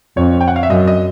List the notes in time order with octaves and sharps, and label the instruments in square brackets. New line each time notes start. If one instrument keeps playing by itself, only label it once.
[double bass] F2 [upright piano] C#5
[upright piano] G5
F#5
F5
E5
[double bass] F#2 [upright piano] D#5
[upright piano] D#5